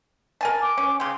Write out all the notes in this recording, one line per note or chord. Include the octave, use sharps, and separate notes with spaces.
A#4 G#5 A5
D6
C#4
C#3 G4 C6